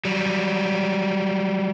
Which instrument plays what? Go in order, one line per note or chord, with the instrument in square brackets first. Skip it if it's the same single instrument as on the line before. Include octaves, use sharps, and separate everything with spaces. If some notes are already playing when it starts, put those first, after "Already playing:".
[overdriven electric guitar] F#3 G3